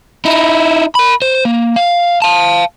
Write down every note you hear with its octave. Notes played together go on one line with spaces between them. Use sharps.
D#4 E4
A#4 B5
C5
A#3
F5
F5 A5